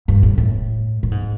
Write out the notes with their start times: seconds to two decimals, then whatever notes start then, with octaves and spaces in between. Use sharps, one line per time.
0.08 G2
0.23 A2
0.38 A2
1.03 A2
1.11 G#2